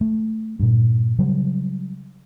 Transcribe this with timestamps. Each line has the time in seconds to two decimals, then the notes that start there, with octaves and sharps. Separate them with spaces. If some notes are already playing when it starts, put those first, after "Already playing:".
0.01 A3
0.59 G2 A#2
1.19 C#3 F#3 G3